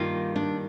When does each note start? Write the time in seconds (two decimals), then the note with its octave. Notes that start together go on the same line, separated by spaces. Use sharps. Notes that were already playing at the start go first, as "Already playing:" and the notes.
Already playing: G2 D#3 G3 A#3 F4
0.36 D4